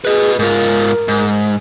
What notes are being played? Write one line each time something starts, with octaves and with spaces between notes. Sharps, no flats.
G#4 B4 D#5
G#2 F4 A#4
G#2